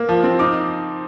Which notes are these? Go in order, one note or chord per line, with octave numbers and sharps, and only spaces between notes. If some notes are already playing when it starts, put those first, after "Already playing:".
Already playing: A#3
F3
C4
D#4 D6